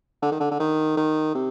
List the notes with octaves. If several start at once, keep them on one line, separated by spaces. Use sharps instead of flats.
D3
D#3
D3
D3
D#3
D#3
C3